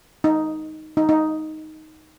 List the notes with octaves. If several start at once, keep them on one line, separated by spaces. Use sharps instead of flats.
D#4
D#4
D#4